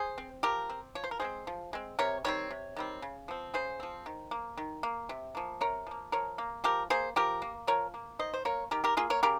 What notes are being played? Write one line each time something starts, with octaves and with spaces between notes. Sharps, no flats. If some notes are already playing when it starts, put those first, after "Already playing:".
Already playing: G#4 C5
C4
F3 G4 A#4
C4
F3 C#5
C5
A#4
G#3 C4 G#4 C5
F3
G#3 C4
C3 A#4 C#5
D#3 G3 C4 C#5
C3
D#3 G3 C4
C#3
F3 C4
C#3 G#4 C5
F3 C4
D#3
A#3
D#3
A#3
C3
F3 A#3
C3 A#4 C#5
F3 A#3
F3 A#4 C#5
A#3
F3 G4 A#4
A#3 G#4 C5
F3 G4 A#4
A#3
F3 A#4 C#5
A#3
D#3 C5 D#5
C5
A#3 A#4 C#5
D#3 G4 A#4
G4 A#4
A#3 F4 G#4
A#4 C#5
C#3 G4 A#4